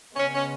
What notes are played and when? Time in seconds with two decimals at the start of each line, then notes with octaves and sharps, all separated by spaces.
0.16 C#3 G#3 B3 C#4
0.35 C#4